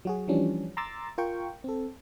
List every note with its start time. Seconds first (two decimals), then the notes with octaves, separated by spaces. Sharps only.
0.05 F#3 F#4 G#4
0.28 E3 F3 G3 C#4 D4
0.77 A#5 C6 D6 E6 A6
1.18 F4 A#4 G5 C#6
1.64 C4 A4